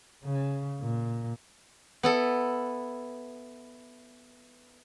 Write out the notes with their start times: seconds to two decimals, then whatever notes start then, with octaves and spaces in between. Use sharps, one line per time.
0.25 C#3
0.80 A#2
2.03 B3 E4 A4